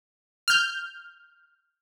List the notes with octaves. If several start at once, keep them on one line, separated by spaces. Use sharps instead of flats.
F6 G6